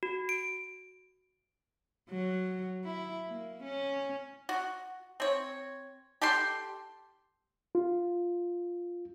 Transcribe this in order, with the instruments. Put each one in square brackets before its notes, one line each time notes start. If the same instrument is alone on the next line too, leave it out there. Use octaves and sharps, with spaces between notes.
[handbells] F#4
D7
[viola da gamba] F#3
E4
A#3
C#4
[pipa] F#4
C4 C#5
G4 A4 G5 C6
[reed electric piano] F4